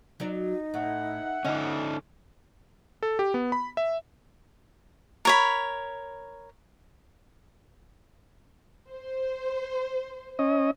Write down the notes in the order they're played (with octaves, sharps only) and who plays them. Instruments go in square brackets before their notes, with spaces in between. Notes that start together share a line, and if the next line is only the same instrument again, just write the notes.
[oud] F#3 F#4 D5 [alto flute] D#4
[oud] A2 [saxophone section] E5 F#5
[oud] D3 D#5 [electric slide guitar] C#4 D#4
[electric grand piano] A4
G4
B3
B5
E5
[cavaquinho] A#4 C#5 B5
[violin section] C5
[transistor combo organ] C#4 D#5